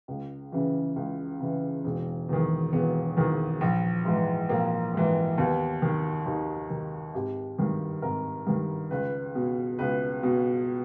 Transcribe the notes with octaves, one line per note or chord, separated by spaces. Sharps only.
C#2
C#3 E3
C#2
C#3 E3
E1
E2 D#3
E1 B3
E2 D#3
A#1
G#2 E3
A#1 A#3
G#2 E3
D#2 B3
D#3
D#2 D#4
D#3
G#1 G4
G2 D#3
G#1 A#4
G2 D#3
C#2 B4
B2
C#2 B4
B2